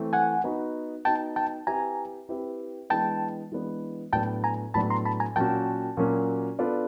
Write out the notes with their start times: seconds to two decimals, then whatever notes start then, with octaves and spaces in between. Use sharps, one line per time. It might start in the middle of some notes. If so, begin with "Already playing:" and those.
Already playing: E3 A3 C4
0.13 F#5 G#5
0.44 B3 D#4 F#4
1.05 B3 D#4 F#4 G5 A5
1.36 G5 A5
1.67 C4 E4 G4 B4 E5 G#5 A#5
2.29 C4 E4 G4 B4 E5
2.90 E3 G#3 B3 D4 G5 A5
3.52 E3 G#3 B3 D4
4.13 A2 F#3 B3 D4 G5 A5
4.44 G#5 A#5
4.74 A2 F#3 B3 D4 A5 B5
4.90 A#5 C6
5.06 A5 B5
5.20 G#5 A#5
5.36 A#2 F#3 A#3 C#4 F#4 G5 A5
5.97 A#2 F#3 A#3 C#4 F#4
6.59 B3 D4 F4 A4 D5